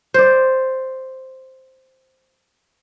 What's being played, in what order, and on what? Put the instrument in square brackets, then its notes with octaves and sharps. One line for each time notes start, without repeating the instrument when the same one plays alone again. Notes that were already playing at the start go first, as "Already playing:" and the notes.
[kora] C5 D5